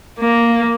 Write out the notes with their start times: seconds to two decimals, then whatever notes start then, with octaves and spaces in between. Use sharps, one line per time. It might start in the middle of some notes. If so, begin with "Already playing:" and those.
0.19 A#3